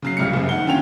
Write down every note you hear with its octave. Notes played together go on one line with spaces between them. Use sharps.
C#3 F#3 C7
D1 C#2 G3 F6 C#7
F#1 F#2
D#3 F#5 G7
D#2 D3 C#4 F4 G5 F7